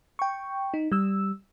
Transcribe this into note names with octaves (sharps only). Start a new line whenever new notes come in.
G5 C#6
D#4
G3 E6